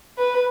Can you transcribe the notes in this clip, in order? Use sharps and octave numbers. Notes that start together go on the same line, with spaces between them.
B4